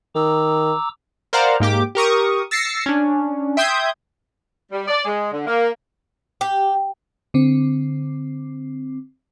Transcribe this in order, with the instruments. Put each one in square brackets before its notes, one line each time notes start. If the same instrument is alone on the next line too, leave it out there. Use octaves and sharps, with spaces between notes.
[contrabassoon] D#3 [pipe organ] A#5 D6 E6
[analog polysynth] A#4 C5 D5 F5 F#5 A#5
G#2 A#3 G4 D6
G4 A#4 C#6 D#6
E6 A6 A#6 C7 C#7
C#4 D4
E5 G5 C6 D#6 G6 G#6
[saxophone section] G3
D5
G#3
D3
A#3
[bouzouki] G4
[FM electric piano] D3 C4